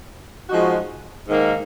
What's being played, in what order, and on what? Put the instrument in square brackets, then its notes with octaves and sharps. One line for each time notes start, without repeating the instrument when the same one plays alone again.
[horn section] F3 G#3 D#4 F#4
G#2 D#3 A#3